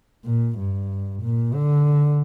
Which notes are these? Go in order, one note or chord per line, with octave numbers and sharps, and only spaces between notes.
A#2
G2
A#2
D3